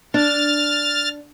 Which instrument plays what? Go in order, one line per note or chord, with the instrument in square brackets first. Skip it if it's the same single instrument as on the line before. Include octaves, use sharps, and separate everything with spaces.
[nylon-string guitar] D4 [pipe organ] F6 A6